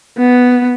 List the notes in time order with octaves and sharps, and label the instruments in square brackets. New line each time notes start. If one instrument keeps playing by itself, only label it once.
[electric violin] B3